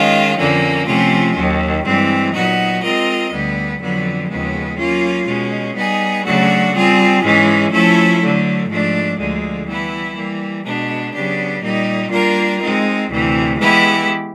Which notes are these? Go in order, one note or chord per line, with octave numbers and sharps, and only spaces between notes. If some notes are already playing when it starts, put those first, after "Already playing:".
Already playing: D#3 G#3 C#4 F4
F2 D3 F3 A#3 C#4
C3 F3 A3 C#4 F4
D#2 D#3 F#3
G2 E3 G#3 C4
A#2 F#3 B3 D#4 F#4
G#3 C4 F4 A#4 D#5
D2 D3 G3 B3
F2 D3 F#3 B3
D#2 C#3 F3 G#3 B3
F#3 A#3 C#4 F4
B2 G#3 C#4
G3 B3 D#4 G#4
C#3 F#3 A3 D4 F#4
G3 C4 F4 G#4
G#2 E3 G#3 C#4
F3 A3 C#4 E4 A4
D3 F#3 A3
G#2 F3 A3 D4
D2 D3 F3 G#3
E3 G3 B3 E4
E3 G3 A#3
B2 G#3 B3 D4
C#3 F#3 B3 D4 G4
A#2 G3 A#3 D#4
G3 A#3 D4 F4 A#4
G#3 C4 D#4
D2 C3 E3
E3 G#3 B3 E4 G4